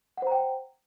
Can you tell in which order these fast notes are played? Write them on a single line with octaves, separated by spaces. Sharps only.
F#5 C5 A#5 G5